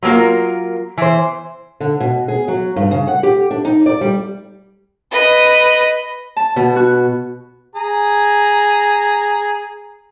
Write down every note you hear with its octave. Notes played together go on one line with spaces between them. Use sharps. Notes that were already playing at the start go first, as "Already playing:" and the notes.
F#3 G3 A#3 F4 A#4
E3 C5
D3
B2
G#4
F#3
G2
C#3
F#5
G4
D4
D#4
D5
G3
B4 D#5
A5
B2
F#4
G#4 A#5